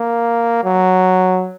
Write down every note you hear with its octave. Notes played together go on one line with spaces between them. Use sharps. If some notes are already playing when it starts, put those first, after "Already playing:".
Already playing: A#3
F#3